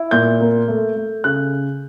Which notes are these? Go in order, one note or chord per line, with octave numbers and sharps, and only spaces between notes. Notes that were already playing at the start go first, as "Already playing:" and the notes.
Already playing: E4
A#2 G6
A#3
A3
A3
C#3 F#6